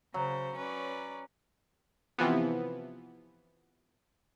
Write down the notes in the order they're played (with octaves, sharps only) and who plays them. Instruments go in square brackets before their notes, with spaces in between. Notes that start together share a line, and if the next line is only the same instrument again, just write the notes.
[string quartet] C#3 C5 [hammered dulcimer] F#3
[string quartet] C#4 B4 D5
[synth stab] C3 E3 F3 B3